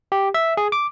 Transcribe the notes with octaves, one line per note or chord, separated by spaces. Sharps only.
G4
E5
G#4
D6